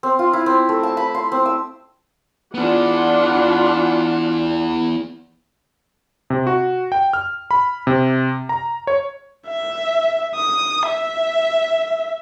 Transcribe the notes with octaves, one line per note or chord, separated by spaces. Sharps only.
C4
F4
E4
C4
A3
A5
B5
C6
C4
E6
E3 B3 D4 F4 F#5
C3
F#4
G5
F6
B5
C3
A#5
C#5
E5
D#6
E5